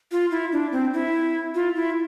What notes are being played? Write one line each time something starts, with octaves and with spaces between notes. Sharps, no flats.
F4
E4
D4
C4
E4
F4
E4